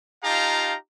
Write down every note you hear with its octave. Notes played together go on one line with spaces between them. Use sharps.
D#4 F4 G4 F5 A5 A#5